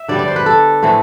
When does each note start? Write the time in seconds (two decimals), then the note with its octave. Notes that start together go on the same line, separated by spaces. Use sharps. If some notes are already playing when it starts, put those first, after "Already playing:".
Already playing: E5
0.08 D3 G3 B3 D5
0.19 D5
0.28 C5
0.36 B4
0.46 A4
0.83 A2 E3 A3 C4